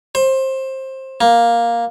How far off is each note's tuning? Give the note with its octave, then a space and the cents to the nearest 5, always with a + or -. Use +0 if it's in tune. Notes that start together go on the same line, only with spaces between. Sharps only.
C5 +20
A#3 +5